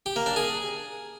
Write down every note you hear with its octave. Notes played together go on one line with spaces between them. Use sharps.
G4
A#3
D4
G#4